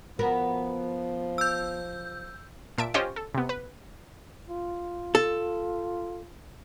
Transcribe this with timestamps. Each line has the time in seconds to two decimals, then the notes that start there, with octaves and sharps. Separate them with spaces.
0.19 F3 B3 F#4 A#4
1.38 E6 G6
2.78 A#2 E5 A5 D7
2.94 C#4 F4 G4 C5 D#5 G5
3.16 A4
3.35 C3 B3
3.49 B4
4.49 F4
5.15 A4